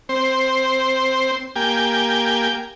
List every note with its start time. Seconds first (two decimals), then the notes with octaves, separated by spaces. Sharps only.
0.09 C4 C5
1.56 A#3 G4 G5 G#5